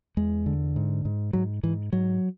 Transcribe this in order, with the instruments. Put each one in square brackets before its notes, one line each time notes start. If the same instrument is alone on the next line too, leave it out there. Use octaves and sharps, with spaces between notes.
[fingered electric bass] E2 G#3
D3
G#2
G#2
G#2 F#3
G#2 E3
G#2 F#3